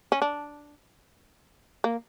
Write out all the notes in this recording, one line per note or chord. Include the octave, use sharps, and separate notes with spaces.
C#4
D4
A#3